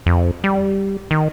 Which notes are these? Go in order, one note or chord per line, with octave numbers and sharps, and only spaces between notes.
F2
G3
D#3